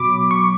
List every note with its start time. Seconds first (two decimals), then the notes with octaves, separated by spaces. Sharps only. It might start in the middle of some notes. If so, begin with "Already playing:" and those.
Already playing: B2 F#3 B5 D6
0.31 C#6